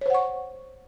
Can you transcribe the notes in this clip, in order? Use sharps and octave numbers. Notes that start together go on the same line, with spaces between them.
C5 C#5 F#5 C#6